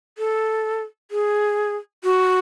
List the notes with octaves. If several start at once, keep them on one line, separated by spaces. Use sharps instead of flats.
A4
G#4
F#4